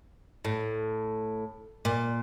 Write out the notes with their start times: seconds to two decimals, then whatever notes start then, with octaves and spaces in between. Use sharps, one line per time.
0.45 A2
1.85 A#2